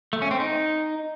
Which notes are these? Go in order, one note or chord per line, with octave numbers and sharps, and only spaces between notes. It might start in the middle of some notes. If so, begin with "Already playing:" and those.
A3
C#4
C4
D#4